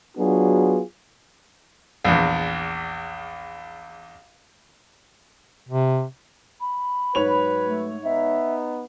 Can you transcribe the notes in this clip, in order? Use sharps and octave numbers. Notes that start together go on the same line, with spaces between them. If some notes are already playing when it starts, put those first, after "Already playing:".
F#3 B3 D4 F4 F#4 G#4
A#1 E2
C3
B5
G#2 F#3 B4 C#5 F7
A3
B3 D#4 E5